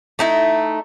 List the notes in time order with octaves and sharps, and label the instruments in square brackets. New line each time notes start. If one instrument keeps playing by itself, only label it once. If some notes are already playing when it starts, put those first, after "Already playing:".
[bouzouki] A3 D#4 E4